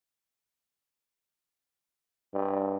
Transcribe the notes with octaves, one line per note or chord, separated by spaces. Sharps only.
G2